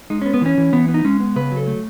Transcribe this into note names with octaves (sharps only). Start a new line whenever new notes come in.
G#3 D#4
B3 C#4
B3
E3 C#4
E3
E3 B3
B3
D#4
G#3 C#4
B3
C#3 B4
F#3
A4
A3